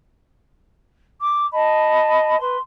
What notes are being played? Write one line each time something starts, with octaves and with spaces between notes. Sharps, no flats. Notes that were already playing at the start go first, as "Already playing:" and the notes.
D6
D#5 A5 B5
B4 C6